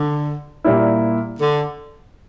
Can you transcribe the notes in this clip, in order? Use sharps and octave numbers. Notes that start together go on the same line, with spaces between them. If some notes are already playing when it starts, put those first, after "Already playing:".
Already playing: D3
A#2 G3 A#3 E4
D3